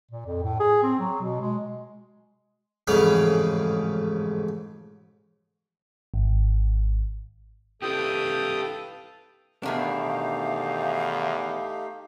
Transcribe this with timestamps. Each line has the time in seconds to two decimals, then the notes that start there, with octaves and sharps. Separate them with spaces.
0.11 A#2
0.26 F2
0.43 A2
0.60 G#4
0.83 C4
0.99 F#3
1.21 B2
1.41 G#3
2.87 A1 F2 G#2 C#3 F5 B5
6.14 G#1
7.82 D4 E4 G4 A4 B4 F5 G5 D#6
9.63 E2 B2 D#3 A3 D4 D#4 G4 F5